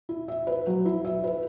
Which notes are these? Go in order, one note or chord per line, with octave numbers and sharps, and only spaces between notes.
E4
E5
B4
F#3
E4
E5
B4